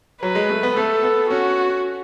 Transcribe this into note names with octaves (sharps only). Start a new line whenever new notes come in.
F#3 B4
G#3
A3
B3
A3 A4
B3
C#4 F#4